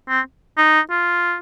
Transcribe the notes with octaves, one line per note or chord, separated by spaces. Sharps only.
C4
D#4
F4